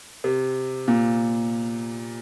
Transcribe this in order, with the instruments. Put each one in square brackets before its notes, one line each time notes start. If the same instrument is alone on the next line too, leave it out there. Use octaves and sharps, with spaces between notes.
[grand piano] C3
A#2